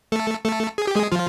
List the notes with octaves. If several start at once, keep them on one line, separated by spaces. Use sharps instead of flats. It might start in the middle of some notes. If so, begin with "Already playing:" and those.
A3 A4
A3 A4
G#4
G4
G#3 G#4
F3 F4